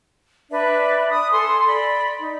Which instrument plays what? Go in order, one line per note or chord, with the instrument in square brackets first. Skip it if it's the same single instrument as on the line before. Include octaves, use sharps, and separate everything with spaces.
[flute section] D4 B4 D5 E5
D#6
A4 G#5 C6
D5 B5
D#4